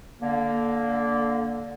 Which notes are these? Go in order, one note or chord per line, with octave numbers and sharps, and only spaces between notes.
D3 A#3